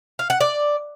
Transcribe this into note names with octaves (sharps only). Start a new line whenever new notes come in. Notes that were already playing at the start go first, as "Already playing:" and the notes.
F5
F#5
D5